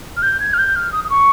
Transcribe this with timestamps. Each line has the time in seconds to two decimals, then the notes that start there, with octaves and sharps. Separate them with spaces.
0.17 F6
0.22 G6
0.40 G#6
0.54 F6
0.58 G6
0.76 F6
0.92 D#6
1.04 D#6
1.10 C#6